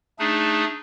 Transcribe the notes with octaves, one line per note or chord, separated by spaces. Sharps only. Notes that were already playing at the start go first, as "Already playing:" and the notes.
A3 D4 D#4 G#4